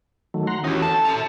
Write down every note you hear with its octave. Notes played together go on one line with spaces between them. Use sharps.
D#3 F#3 A3
F#5 A#5 C6
E3 C#4 D#4 F#4 G4
A4 A5
E5 A#5